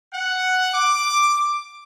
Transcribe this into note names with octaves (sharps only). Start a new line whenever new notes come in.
F#5
D6